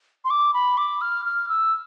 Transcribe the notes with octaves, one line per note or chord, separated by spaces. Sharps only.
C6
D6
B5
D6
F6
F6
E6